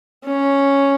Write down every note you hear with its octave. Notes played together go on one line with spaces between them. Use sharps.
C#4